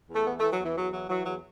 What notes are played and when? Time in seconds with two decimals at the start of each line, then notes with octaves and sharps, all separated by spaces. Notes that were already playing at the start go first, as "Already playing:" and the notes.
0.09 E2
0.15 A3
0.26 E3 B3
0.39 E3 A3
0.51 F#3
0.60 E2 E3
0.76 E2 F#3
0.93 E3 F#3
1.09 E3 F#3
1.26 E2 F#3